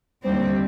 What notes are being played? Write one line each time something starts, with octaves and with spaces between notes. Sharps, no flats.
D#2 D3 G3 C4